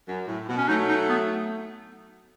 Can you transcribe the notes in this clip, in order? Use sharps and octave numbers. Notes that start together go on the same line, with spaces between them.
F#2
A2
B2
C#4
F#3 A3 D#4
D#4
B3